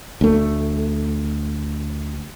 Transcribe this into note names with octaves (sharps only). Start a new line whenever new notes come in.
D2 A3